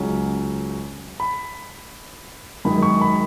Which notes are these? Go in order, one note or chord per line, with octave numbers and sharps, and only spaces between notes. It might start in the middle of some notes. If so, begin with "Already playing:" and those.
Already playing: C#2 C#3 F#3 C#4
B5
F#2 D#3 G#3 B5
C#6
B5